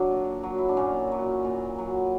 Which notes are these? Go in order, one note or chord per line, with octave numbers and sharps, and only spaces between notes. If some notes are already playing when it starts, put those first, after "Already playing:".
Already playing: F#3 D4
A#2
F#3
E4
D4
A#2 C#4
F#3
A#2
F#3